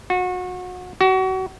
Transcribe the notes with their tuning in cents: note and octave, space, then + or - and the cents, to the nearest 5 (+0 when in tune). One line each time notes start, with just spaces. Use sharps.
F#4 -30
F#4 +30